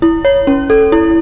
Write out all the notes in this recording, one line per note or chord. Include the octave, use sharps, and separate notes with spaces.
E4
C#5
C#4
A4
E4